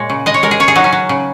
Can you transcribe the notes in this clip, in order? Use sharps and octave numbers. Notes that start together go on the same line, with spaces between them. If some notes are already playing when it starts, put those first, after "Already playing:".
Already playing: A#2 G#3 C#5
C#3
G#3 D#5
C#5
G#3 A#4
G#4
C#3 C#5
G#4
F#3 D#4
C#4
F#3
C#3